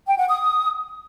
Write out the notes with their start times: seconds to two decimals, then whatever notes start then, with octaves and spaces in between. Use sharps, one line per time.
0.07 G5
0.18 F#5
0.29 D#6